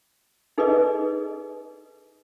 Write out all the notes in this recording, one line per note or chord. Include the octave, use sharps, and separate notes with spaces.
D#4 G#4 A4 B4 D5 D#5